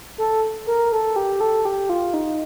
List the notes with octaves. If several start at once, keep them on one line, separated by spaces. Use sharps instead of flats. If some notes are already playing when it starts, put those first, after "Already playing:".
A4
A#4
A4
G4
A4
G4
F4
D#4